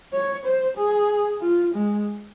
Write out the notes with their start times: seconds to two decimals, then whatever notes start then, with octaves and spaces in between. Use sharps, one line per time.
0.13 C#5
0.45 C5
0.77 G#4
1.42 F4
1.74 G#3